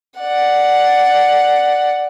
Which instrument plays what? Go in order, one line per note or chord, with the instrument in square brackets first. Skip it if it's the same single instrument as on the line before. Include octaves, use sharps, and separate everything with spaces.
[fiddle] D5 F#5